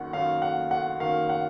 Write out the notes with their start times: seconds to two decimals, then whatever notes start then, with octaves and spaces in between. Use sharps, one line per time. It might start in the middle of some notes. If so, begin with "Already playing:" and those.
Already playing: F#2 D#3 A#3 F#5
0.13 F#2 D#3 A#3 F5
0.42 F#5
0.71 F#5
1.00 F#2 D#3 A#3 F5
1.29 F#5